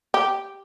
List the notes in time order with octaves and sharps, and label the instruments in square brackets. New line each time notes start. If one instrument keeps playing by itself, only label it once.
[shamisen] G4